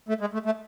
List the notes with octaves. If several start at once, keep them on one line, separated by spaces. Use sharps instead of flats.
A3
G#3
A3
A3